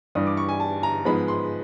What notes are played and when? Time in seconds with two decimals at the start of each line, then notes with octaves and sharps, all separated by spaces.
0.15 G2 E3 G3 D#6
0.27 D6
0.37 C#6
0.49 G#5
0.60 A5
0.83 A#5
1.05 G#2 F3 G#3 B3 B5
1.28 C6